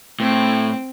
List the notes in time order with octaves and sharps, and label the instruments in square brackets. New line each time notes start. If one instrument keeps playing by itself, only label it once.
[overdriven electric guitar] A2 [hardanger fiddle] C4